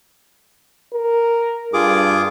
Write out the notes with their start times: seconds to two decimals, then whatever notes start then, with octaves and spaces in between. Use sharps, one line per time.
0.93 A#4
1.73 G2 F4 G#4 D6